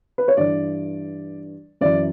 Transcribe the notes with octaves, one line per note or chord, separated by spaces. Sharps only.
B4
C#5
G2 E3 D5
F#2 E3 D5